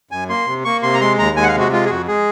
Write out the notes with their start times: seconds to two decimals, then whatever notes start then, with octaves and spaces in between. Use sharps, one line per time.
0.11 F#2 G#5
0.29 A#3 C6
0.47 C3
0.65 A#3 C#6
0.83 C3 C6
0.94 A#5
1.00 G#3 C6
1.18 D#2 A#5
1.36 G#3 G#5
1.43 F#5
1.48 F5
1.54 C3
1.59 F#4
1.72 G#3 F4
1.86 G#4
1.89 F2 F#4
2.07 G#3 G#4